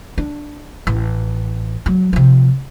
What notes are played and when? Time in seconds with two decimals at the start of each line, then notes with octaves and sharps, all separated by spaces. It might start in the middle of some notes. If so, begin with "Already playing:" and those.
0.18 D4
0.87 A1
1.86 F#3
2.13 C3 F3